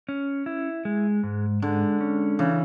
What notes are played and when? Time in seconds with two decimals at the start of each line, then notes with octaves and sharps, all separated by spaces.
0.09 C#4
0.46 E4
0.85 G#3
1.23 G#2
1.62 D3 G#3
2.01 C#4
2.39 C#3 E3